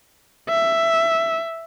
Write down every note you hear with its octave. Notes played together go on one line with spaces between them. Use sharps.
E5